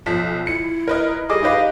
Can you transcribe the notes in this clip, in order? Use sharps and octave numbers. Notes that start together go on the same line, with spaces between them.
B1 F3 B6
E4 C#7
A#4 B4 D#5
G3 G#4 A4 D#5 D6
D#4 G4 B4 F5